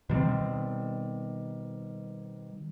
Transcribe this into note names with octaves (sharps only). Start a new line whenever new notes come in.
B2 D#3 G3 C4